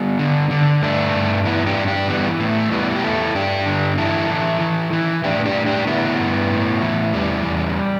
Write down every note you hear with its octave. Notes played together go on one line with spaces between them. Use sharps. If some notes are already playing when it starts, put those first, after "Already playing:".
Already playing: G3 B3
D3
D3
G2 A3 D4
G2
E3 B3 E4
D4 G4
G2
D4 G4
E3 G3 B3
A2
A3
E3 G3 B3
G4
E2 E4 A4
G2 D4 G4
D3
E3 E4 A4
E3
E3
E3
A2 D4 G4
D4 G4
A2
D4 G4
D3 B3 E4
G2
A2
E3
E2 G3
E2